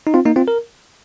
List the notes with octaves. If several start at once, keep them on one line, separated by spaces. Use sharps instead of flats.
D#4
C4 F4
A#3 D#4
C4 F4
A#4